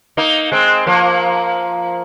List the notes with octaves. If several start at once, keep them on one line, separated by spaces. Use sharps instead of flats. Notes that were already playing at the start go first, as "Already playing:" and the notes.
A#3 D#4
G#3 C4
F3 A#3